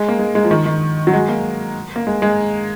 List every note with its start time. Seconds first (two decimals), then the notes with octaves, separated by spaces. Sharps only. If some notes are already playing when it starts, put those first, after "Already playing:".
Already playing: G#3
0.09 A#3
0.19 G#3
0.35 G#3
0.44 F3
0.51 D#3
0.66 D#3
1.07 F#3
1.13 G#3
1.29 A#3
1.96 A#3
2.07 G#3
2.22 G#3